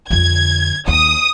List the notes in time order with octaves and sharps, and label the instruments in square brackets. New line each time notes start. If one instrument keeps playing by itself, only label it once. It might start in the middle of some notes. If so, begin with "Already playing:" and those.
[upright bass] F2 D3 [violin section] G#6
[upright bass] D#2 [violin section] D#6